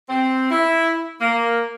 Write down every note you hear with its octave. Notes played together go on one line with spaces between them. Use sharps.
C4
E4
A#3